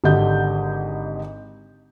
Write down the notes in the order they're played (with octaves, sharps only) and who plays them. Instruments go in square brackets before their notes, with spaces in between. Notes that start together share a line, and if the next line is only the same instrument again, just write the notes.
[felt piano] G#1 D3 G4 D#5 G6